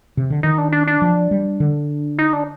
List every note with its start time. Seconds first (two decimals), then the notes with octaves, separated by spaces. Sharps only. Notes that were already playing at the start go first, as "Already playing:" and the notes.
0.17 C3
0.30 D3
0.43 D#3 D#4
0.58 D4
0.72 D4
0.87 D4
1.02 F3
1.31 G3
1.60 D3
2.19 D#4
2.33 D4